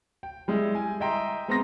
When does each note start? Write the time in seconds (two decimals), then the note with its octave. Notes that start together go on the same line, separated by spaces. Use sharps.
0.23 G5
0.48 G3 G#3 E4
0.75 G#5
1.00 D#5 E5 G5 A#5 C6
1.48 G#3 B3 C4 A#5 C6 A#6